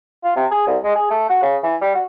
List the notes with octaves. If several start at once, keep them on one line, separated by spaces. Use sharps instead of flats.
F4
C3
G#4
C2
G#3
G#4
A3
F#4
C#3
E3
G3
F#4